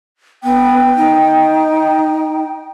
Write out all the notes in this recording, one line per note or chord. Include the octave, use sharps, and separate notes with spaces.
B3 G5
D#4